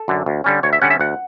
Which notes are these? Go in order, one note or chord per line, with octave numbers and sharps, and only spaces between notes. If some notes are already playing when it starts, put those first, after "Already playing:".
Already playing: A4
F#2 D3
D2
D3 G3 C#4
D2 C#5
E5
D3 G3 C#4 F#5
E5
D2 F#5